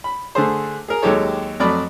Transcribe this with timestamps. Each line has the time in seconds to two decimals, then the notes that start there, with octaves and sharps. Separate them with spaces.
0.04 B5
0.35 D3 A3 G#4 C5
0.88 G#4 A#4
1.02 D#2 F#3 G#3 G4 A4 C#5
1.60 F2 F#3 A3 D5 B5 C#6